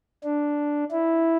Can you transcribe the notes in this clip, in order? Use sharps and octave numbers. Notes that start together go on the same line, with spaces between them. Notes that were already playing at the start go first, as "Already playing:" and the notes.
D4
E4